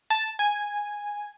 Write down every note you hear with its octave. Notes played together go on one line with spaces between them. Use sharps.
A5
G#5